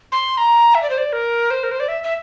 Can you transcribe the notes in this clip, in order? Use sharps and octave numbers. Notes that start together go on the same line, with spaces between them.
C6
A#5
E5
D5
C5
D5
A#4
C5
A#4
C5
D5
E5
E5